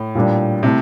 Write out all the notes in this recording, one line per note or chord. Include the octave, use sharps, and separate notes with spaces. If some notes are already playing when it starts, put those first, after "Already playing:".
Already playing: A2
A#2 G3 D4
C3 A3 E4